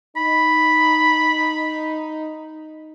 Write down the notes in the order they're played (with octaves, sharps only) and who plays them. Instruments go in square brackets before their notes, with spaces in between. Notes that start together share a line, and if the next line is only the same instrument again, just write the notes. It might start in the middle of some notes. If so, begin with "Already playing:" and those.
[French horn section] D#4 [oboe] B5